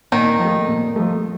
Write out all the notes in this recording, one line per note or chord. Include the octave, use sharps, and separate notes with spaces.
A#2 D#3 D#4
F3
A3
A#2
F3 A3